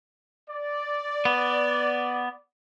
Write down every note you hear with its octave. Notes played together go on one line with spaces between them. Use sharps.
D5
B3